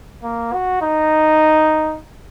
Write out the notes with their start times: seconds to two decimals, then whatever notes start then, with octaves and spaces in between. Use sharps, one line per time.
0.23 A#3
0.53 F#4
0.82 D#4